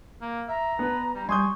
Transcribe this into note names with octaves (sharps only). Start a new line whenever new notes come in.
A#3
E5 A#5
B3 D4 B4
G3 A#5
G3 G#5 C6 C#6 D#6 G6